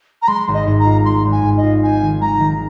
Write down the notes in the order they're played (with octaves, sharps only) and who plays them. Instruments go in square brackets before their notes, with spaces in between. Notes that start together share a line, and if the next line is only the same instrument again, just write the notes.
[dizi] A#5
[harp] G#3 [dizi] C6
[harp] G#1
[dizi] D#5
[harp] G#2
[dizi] A#5
[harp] F4
[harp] G#3 [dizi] C6
[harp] G#1
[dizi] G#5
[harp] G#2
[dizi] D#5
[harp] F4
[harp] C4 [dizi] G#5
[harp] D#3
[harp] G#3 [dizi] A#5
[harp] D#3